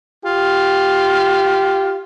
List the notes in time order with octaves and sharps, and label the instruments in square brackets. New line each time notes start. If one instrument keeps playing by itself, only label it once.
[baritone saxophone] F4 [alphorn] G4